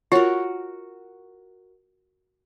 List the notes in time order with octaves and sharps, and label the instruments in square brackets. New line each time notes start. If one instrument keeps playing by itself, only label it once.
[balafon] F4 C#5 [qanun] F#4 A#4